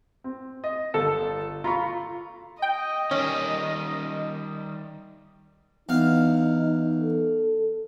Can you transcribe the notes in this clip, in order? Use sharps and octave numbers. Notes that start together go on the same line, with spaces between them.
C4
D#5
G1 A4
F4 A#5 B5 C#6
D#5 G5
D#3 G3 C#4
E2 D#4 F5
A4